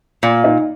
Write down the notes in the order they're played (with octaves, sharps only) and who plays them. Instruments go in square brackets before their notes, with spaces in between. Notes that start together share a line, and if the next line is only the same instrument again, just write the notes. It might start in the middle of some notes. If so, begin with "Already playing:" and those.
[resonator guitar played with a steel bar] A#2
[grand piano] D#4